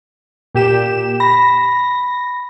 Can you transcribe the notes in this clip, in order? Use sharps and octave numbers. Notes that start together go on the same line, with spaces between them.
A#2 G4 E7
B5 A#6